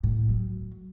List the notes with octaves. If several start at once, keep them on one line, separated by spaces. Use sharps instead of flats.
A2
F#3